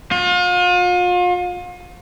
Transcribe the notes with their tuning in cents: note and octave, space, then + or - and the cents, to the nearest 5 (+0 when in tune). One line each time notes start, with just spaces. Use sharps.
F4 +40